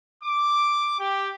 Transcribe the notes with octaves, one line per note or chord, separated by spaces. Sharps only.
D6
G4